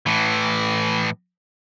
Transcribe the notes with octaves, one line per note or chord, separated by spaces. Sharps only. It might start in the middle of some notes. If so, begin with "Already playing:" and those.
A2 E3